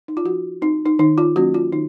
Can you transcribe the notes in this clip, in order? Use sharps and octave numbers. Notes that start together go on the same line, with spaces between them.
D#4
F4
F3 F#4
C4 D#4
D#4
D#3 D#4
F4
F#3 A#3 C#4 F#4
F4
D#3 D#4